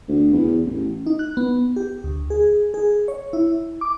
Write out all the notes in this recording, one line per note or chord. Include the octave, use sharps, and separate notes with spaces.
D2
E2
A1
D#4
F#6
B3
G4
D2
G#4
G#4
C#5
E4
D6